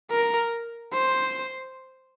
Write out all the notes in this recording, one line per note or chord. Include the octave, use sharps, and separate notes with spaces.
A#4
C5